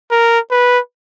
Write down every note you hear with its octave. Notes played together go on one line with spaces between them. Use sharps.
A#4
B4